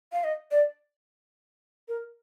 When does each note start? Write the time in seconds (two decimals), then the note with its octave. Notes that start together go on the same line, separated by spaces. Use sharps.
0.12 F5
0.24 D#5
0.51 D5
1.88 A#4